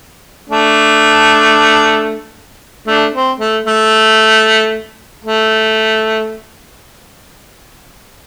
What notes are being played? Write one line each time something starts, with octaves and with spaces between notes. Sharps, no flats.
A3 D4
A3 D4
C4
A3
A3
A3